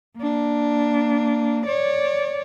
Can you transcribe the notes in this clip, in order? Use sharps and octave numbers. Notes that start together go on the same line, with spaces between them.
A#3 D4
C#5 D5